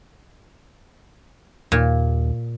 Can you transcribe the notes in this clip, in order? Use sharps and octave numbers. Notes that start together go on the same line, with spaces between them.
D#2 A#2